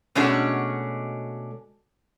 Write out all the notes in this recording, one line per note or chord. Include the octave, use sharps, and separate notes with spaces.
B2 G#3 A3 C#4 D4 F#4